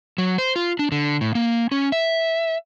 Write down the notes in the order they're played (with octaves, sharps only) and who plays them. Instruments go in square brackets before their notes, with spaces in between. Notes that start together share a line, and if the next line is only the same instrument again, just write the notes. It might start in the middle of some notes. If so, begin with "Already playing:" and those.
[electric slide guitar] F#3
C5
F4
D4
D3
A2
A#3
C#4
E5